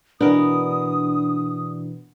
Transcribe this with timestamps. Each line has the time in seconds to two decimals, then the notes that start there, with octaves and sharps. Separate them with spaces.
0.21 B2 E3 B3 D4 A#4 D#6